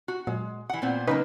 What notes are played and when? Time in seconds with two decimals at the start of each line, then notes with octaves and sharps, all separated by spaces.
0.08 F#4
0.27 A#2 F#3 G#3
0.70 E3 F#5
0.82 A#2 B3 C4
1.07 C#3 F#3 A#3 C#4 D#4 B4